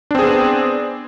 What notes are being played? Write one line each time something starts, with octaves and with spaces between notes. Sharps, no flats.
B3 C4 D4 G#4